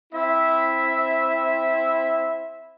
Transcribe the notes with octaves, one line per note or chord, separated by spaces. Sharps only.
C4 E4 E5